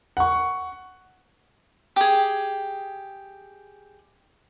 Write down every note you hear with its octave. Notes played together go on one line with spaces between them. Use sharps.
F#5 C#6
G4 G#4